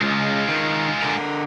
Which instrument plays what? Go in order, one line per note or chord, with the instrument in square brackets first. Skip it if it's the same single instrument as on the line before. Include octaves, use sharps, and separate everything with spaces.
[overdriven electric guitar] C#2 [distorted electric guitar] G#3 F4
[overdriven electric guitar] D#3
D3 A#4